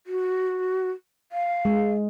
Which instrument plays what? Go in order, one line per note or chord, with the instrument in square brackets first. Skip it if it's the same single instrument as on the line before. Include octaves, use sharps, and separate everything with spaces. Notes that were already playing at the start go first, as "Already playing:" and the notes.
[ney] F#4
F5
[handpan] G#3